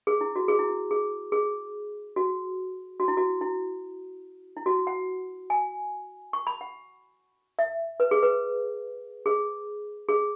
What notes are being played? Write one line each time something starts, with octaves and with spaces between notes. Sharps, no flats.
G#4
E4
F#4
G#4
E4
E4
G#4
G#4
F#4
F#4
E4
F#4
E4
E4
F#4
F#5
G#5
C#6
B5
F#5
E5
B4
G#4
B4
G#4
G#4